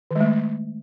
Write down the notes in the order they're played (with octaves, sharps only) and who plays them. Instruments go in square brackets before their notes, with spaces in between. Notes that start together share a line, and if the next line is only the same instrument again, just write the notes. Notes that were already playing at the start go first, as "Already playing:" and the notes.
[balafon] D#3
G#3
A3